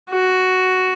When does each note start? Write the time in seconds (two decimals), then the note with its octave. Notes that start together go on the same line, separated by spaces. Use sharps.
0.10 F#4